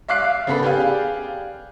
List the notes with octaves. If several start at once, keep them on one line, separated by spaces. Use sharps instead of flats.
E5 F5 D6 F#6 C7
C#3 B3 A4 B5
G4 G#4 D5 F5